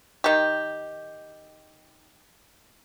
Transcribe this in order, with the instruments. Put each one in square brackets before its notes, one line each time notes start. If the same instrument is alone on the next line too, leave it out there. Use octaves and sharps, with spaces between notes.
[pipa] D#3 G4